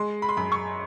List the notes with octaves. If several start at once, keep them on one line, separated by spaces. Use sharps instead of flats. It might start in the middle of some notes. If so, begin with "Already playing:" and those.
Already playing: G#3 C6
B5
C6
F#2 B5
C#6